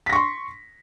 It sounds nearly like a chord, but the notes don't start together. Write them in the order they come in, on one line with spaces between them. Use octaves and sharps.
B6 A#6 C#6 C6